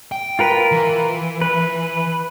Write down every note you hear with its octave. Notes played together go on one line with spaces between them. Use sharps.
G5
F4 A#4 B4
E3
B4